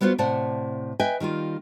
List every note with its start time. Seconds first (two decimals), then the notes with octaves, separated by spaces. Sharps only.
0.01 G3 B3 F4 F#4 C5
0.18 A2 C3 C5 D5 F#5 A5
0.99 B4 D#5 E5 G5 G#5
1.20 D#3 G3 A#3 F4